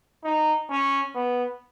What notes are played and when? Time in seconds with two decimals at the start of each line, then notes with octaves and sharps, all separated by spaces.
0.24 D#4
0.70 C#4
1.15 B3